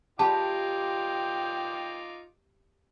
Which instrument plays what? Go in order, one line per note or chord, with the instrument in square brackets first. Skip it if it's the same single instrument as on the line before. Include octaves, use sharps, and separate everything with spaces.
[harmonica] D#4 F4 D6 [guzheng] G4 [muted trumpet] G5 [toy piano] A5 B5